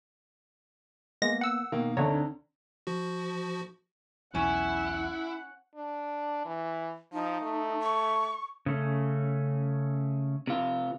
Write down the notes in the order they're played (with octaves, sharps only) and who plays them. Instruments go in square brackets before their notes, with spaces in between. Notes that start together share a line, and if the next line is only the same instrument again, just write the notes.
[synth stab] G#3 A#6 [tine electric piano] A#3 B3
[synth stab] F#5 E6
[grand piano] B2 A#3 [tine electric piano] D#3
[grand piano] D2 D3 D#3 [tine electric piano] C4 D4 A#5 [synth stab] C#5
[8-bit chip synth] F3 F#4
[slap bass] B1 E2 F#3 [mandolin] C#4 [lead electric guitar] E4 [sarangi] F#5
[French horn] D4
E3
[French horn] F3 [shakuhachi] D#4
[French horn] A3
[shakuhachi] C#6
[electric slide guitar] C#3 A3 C#4
[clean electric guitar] C3 F4